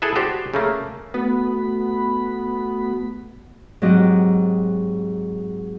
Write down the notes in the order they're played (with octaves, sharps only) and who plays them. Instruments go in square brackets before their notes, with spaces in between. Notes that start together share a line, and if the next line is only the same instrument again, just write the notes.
[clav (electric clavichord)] E4 G#4 A4 B4 E5
F#4 G4 C5 D5
C#3 A3 A#3
[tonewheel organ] A3 F#4 B5 [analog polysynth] B3
[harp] G#2 F#3 C4 G4 D#5 F#5